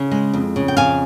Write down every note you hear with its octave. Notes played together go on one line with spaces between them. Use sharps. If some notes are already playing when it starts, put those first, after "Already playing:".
Already playing: C#3
G#3
F2
C#3
G5
F2 F5 G#5